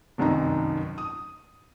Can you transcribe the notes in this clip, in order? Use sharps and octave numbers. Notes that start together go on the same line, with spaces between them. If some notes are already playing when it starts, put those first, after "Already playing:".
F1 C2 F#2 D#3 D#4 A#5
D#6